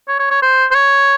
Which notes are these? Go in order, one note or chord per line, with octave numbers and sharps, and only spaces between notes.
C#5
C#5
C#5
C5
C5
C#5